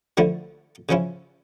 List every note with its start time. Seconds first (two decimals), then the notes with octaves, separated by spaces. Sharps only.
0.17 D3 F3 A3 E4
0.89 C#3 F3 C#4 E4